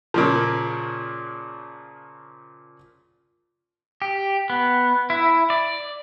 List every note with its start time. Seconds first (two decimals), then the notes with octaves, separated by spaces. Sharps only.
0.14 A#2 C#3 F3
4.02 G4
4.50 B3
5.10 E4
5.50 D5